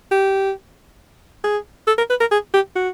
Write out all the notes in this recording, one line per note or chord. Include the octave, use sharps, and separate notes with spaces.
G4
G#4
A4
A#4
B4
A#4
G#4
G4
F#4